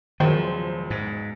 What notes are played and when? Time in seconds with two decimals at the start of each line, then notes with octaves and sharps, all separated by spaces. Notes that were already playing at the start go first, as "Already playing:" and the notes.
0.20 E1 C#2 D#3 F3 F#3 C5
0.90 G#2